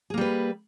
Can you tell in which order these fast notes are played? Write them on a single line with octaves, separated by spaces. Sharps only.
G#4 A#3 G3 B4